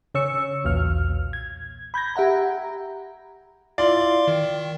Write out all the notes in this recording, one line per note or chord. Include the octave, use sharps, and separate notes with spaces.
C#3 C#5 E6 C#7
B1 E2 A#2 F6
G#6
B5 G6 G#6 A#6
G4 E5 F#5 A#5
E4 F4 D5 E5 F5 C6
D#3 G5